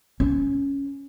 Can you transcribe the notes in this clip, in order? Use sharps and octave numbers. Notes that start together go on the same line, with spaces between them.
C#4